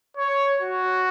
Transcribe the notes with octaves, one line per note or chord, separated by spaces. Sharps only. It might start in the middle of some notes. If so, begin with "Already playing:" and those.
C#5
F#4